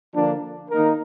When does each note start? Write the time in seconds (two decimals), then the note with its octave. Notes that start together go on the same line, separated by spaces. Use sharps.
0.13 D3 F3 A#3 D4
0.70 D#3 A#3 D#4 A#4